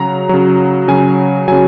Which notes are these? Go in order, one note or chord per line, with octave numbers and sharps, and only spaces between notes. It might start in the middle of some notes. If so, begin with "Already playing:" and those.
Already playing: C#3 F#3 A#5
C#3 F#3
C#3 F#3 G#5
C#3 F#3 G#5